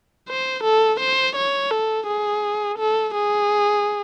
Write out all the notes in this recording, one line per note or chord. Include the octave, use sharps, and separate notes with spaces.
C5
A4
C5
C#5
A4
G#4
A4
G#4